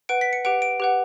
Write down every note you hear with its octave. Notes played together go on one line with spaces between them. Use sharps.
B4 F#5 D7
B6
C#7
G4 B4 F#5 D7
D7
G4 B4 F#5